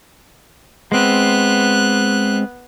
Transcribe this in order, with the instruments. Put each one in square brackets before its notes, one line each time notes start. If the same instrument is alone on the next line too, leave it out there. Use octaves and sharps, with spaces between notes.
[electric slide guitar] G#3 C4 [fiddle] B3 F#6